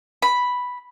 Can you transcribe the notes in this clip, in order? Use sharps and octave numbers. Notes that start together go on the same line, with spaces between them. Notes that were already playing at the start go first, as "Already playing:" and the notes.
B5